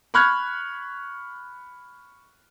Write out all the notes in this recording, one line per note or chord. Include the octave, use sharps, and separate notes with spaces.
B5 C#6 F6 F#6 G#6